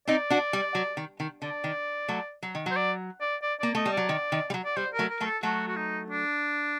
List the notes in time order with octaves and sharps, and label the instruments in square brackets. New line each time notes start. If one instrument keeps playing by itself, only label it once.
[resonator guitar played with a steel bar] C4 D#4 [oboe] D5
[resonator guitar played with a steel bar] D4 F#4
G3
F#3
D#3
D#3
[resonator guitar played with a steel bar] D3 [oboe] D5
[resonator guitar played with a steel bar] D#3
F#3 A3
F#3
D#3
F#3
[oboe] C5
D5
D5
D5
[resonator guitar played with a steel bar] A#3 [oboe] D5
[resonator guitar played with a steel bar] A3 [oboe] D#5
[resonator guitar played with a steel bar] G3
[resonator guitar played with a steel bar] F#3 [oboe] D5
[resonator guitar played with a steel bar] D#3
D#3
G3
F#3
[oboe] D5
[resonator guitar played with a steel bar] G3 [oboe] C5
[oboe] A#4
[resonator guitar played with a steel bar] F#3 A3
[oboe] A#4
[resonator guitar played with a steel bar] F#3 A3
[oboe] A4
[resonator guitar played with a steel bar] F#3 A3 [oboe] F#4
[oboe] F#4
D#4
D4